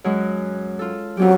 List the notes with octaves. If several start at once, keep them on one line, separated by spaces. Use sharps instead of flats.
F#2 F#3 G#3
F4 A4
F2 F#3 C#4 G4